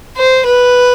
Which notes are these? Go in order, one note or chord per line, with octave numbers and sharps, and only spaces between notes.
C5
B4